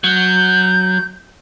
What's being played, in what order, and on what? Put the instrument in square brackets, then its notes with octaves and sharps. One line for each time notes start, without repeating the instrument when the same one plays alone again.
[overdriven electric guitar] F#3 [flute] G6